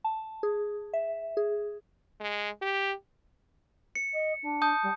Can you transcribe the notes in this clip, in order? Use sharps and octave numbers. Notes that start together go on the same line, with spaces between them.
A5
G#4
E5
G#4
G#3
G4
C#7
D#5
D4
A5 D#6 G6
G3